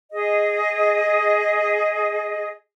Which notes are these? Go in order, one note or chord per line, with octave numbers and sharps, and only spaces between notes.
G#4 D#5